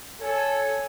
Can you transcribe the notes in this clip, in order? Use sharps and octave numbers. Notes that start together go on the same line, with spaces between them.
A4 C#5 G#5